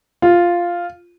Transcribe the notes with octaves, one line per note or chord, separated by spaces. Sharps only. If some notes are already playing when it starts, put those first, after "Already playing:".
F4